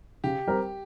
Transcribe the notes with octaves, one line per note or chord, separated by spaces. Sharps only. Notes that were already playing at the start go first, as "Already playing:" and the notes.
C#3 G4
G3 C4 G4 A#4